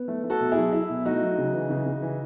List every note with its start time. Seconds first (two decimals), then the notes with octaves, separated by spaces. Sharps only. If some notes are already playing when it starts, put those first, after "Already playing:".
Already playing: B3
0.08 A3
0.24 A3
0.30 F#4 A4
0.40 B2
0.51 E4 G#4
0.57 F#3
0.73 F#3 E4
0.90 B2
1.05 A3 D#4 F#4
1.21 F#3
1.38 C#3
1.53 E3
1.70 C#3
1.86 C#3
2.02 E3